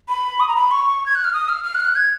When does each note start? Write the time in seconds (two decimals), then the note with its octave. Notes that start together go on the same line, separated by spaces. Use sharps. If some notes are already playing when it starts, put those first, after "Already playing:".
0.09 B5
0.40 D#6
0.48 A#5
0.56 B5
0.71 C#6
1.06 G#6
1.15 F#6
1.24 F6
1.33 D#6
1.49 F6
1.64 F6
1.75 F#6
1.80 F6
1.85 F#6
1.96 G#6